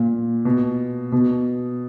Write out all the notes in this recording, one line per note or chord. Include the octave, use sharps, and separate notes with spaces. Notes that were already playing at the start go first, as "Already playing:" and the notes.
Already playing: A#2
B2
B2